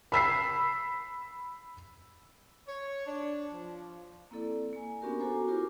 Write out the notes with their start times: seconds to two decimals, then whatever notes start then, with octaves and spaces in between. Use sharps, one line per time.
0.12 B5 E6 B6 C7
2.67 C#5
3.07 D4
3.53 F3
4.31 A#3 C4 E4 A4 D5
4.73 A#3 G#5
5.02 B3 C#4 D4 F#4 G4 A#4
5.18 F#4 A4 C5 G#5 A#5 D6
5.48 E4 F4 G4 A#4 C5 D6